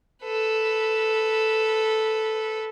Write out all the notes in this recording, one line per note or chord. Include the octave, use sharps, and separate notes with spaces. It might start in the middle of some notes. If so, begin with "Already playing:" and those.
A4 B4